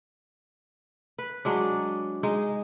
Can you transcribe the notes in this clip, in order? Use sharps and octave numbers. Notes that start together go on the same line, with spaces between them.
B4
F#3 G#3 D4
G#3 D#4